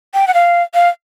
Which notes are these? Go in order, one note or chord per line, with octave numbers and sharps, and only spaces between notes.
G5
F#5
F5
F5